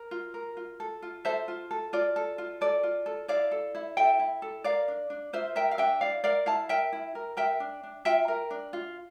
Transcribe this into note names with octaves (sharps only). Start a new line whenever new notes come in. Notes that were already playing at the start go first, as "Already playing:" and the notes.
Already playing: A#4
F4
A#4
F4
A4
F4
A4 C5 E5
F4
A4
F4 D5
A4
F4
A4 D5
F4
A4
E4 D5 F5
A4
E4
A4 E5 G5
E4
A4
A#4 D5 F5
D4
D4
F4 C5 E5
A#4 E5 G5
F5
D4 E5 G5
E4 D5 F5
A#4 D5 F5
E4 F5 A5
A#4 E5 G5
E4
A#4
A#4 E5 G5
D4
D4
F4 E5 G5
A#4
D4
F4